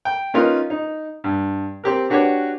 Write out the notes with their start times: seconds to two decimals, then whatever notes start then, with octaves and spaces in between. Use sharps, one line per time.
0.05 G5
0.34 C#4 D#4 F4 A#4 B4
0.70 D#4
1.24 G2
1.84 C4 G4 A#4
2.10 D4 F#4 G4 B4 C#5 D6